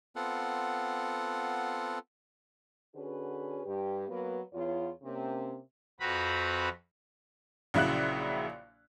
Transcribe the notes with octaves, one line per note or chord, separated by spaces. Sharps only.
B3 C4 F4 A4 F#5
D3 C#4 F#4 G#4 B4
G2 G4
F#3 A#3 B3 B4
E2 F4 C#5
C3 A#3 C#4
F2 C4 F#4 B4 A#5 B5
A#1 C#3 F#3 E4 E5 F#6